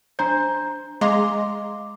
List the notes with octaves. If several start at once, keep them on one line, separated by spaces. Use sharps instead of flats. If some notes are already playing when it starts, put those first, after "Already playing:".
D4 C5 A#5 G6
G#3 D#5 F5 A#5 C6 D6